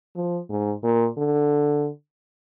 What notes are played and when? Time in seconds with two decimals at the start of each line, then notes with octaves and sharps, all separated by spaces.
0.16 F3
0.49 G#2
0.83 A#2
1.17 D3